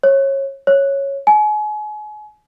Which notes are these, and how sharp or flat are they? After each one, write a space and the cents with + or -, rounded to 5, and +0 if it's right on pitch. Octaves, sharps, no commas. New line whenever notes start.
C#5 -25
C#5 -5
G#5 +35